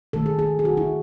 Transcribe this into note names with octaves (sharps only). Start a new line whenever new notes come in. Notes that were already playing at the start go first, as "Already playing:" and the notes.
D#3 A3 A4
G#4
G#4
G#4
F#4
E4